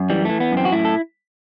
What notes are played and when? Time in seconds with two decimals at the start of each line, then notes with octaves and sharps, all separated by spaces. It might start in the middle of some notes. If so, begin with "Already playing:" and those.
Already playing: F#2
0.10 E3 G3
0.25 E3 A3
0.40 B3
0.52 F#2
0.57 C4
0.65 F#4
0.72 A2 E4
0.85 A4